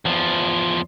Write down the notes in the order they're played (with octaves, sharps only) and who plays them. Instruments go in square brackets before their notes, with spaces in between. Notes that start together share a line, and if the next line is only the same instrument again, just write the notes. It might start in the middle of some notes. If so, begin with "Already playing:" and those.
[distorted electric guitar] E2 F3